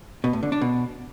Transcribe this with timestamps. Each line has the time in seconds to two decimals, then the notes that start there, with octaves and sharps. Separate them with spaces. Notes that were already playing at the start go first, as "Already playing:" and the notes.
0.24 B2
0.33 A2
0.43 D3
0.52 D4
0.61 B2